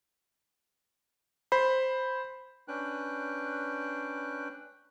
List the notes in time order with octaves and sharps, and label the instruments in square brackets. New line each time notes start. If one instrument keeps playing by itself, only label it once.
[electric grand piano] C5 B5
[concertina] C#4 D4 B4 G5 F#6